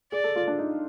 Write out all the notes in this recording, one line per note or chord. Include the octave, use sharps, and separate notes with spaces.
G#4 D5
A4
F4
D4
D#4